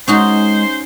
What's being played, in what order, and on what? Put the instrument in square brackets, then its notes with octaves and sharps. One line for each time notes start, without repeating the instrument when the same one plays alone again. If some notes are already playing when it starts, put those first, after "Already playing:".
[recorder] G#3 [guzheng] C#4 D#4 F#4 [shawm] C5